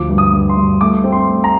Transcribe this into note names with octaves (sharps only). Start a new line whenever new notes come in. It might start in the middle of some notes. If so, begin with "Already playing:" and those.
Already playing: D2 F3 D6
G2
D#6
G2
C6
G2
A3 D6
C4
C6
A3
A#5